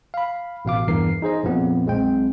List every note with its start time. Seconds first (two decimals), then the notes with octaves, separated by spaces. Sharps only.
0.14 F5 B5
0.65 A1 B2 F5 D6
0.88 E2 G2 E3 A#4 C7
1.22 D#4 G#4 C5 D#5
1.43 A#1 F2 A#2 B3
1.86 B1 G#3 C4 G5